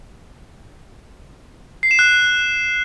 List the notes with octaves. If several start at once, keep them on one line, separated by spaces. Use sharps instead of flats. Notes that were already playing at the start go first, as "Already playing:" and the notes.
C7
E7
F#6